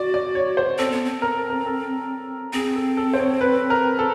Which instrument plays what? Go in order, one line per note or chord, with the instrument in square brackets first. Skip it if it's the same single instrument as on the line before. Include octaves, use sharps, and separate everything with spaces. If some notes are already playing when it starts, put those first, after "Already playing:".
Already playing: [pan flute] F#4 [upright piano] D5
[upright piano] D5
C#5
C5
[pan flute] C4 [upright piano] A4
[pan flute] B3
C4
[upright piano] A#4
A4
A#4
A4
[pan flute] C4 [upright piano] G#4
[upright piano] A4
A4
C5
C#5
B4
A#4
A4